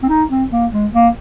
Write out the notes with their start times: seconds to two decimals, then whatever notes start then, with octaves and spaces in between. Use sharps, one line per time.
0.03 C4
0.09 D#4
0.30 C4
0.51 A#3
0.72 G#3
0.93 A#3